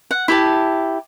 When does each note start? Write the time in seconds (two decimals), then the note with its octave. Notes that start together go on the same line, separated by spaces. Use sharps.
0.11 F#5
0.28 E4 G4 A5